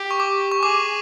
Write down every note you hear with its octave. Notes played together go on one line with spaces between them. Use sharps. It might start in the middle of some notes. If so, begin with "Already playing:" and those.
Already playing: G4
C#6
D6
C#6
G#4 D6